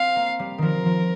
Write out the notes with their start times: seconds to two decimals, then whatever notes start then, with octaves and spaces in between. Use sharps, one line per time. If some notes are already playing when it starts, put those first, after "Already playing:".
Already playing: C4 F5
0.16 A#3
0.39 G3
0.58 D#3 F3 A#4
0.86 F3